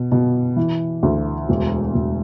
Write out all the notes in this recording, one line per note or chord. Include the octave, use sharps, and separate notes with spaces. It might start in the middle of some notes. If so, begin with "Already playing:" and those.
Already playing: B2
B2
E3
D2
E1
E1